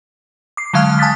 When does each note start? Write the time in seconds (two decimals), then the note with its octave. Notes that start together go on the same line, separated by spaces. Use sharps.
0.57 D6 C7
0.73 D3 F#3 G#3 F5 A5 F6
0.99 G#5 A5 D#6 F#6 A6 B6